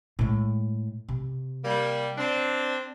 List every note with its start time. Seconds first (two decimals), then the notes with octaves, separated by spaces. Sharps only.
0.19 A2 G#3
1.09 C3
1.65 G3 A#3
2.18 C4 D4